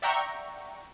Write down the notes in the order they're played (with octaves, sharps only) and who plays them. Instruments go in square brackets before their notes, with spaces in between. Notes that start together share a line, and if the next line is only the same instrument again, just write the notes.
[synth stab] D5 E5 F#5 G5 A#5 C#6